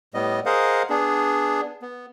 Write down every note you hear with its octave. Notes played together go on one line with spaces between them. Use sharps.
A2 G3 B3 D#5
G#4 A#4 C5 D#5 F5 F#5
B3 D4 G#4
B3